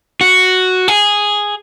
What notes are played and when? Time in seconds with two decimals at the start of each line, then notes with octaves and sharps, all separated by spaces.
0.21 F#4
0.88 G#4